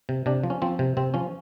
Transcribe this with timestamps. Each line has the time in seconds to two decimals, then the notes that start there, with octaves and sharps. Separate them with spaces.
0.09 C3
0.26 C3 D4
0.44 F3
0.50 C#4
0.62 F3 C4
0.79 C3
0.97 C3 C4
1.14 F3 C#4